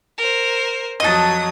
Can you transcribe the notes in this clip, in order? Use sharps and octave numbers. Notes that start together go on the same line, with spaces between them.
A#4 C5
F2 F#3 D#5 A5 D#6